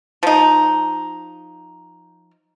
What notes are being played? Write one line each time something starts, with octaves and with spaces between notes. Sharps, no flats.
F3 D#4